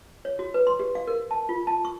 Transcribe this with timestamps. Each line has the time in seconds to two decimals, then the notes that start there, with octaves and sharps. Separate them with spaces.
0.25 C#5
0.39 F#4
0.54 B4
0.67 C6
0.79 G4
0.95 F5
1.07 A#4
1.31 A5
1.49 F4
1.67 A5
1.85 C#6